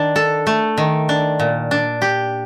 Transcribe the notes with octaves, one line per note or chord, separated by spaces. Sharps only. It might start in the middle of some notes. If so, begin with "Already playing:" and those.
Already playing: D#3 D4
A4
A3
D#3
D4
A#2
D4
G4